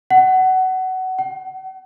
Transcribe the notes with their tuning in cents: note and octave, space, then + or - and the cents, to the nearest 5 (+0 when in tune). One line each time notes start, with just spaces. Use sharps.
F#5 +20
F#5 +40